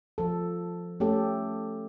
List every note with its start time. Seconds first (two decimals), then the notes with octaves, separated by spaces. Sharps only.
0.18 F3 A4
1.00 A3 C#4 G4 A4